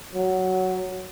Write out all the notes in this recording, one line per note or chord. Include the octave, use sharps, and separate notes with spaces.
F#3